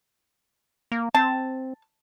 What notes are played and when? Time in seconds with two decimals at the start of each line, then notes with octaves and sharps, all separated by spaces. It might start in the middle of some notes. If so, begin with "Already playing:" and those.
0.92 A#3
1.15 C4 A5